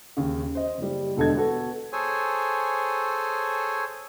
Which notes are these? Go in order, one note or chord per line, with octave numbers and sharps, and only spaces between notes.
D#2 C#3
C5 D#5
F#1 G3
E1 D3 A4 D#5 G#6
B3 F#4 A4
G#4 A4 C5 C#5 G#5